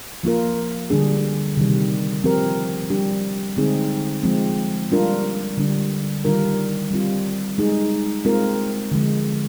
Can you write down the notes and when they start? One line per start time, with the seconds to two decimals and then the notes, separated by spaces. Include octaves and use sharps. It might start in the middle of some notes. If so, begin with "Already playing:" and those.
0.23 F3 A#3 F4 A#4
0.90 D3 G3 D4 G#4
1.57 C3 D#3 G3
2.24 F3 C4 G4 A#4
2.90 G3 D4 G4
3.57 D3 G#3 C4 D#4 G#4
4.23 F3 G#3 C4
4.91 G3 D4 F4 A#4
5.57 D3 G3 D4
6.25 D#3 G3 D4 F4 A#4
6.91 G3 C4 F4
7.58 G#3 D#4 G#4
8.25 G#3 C4 F4 A#4
8.91 D3 F3 G#3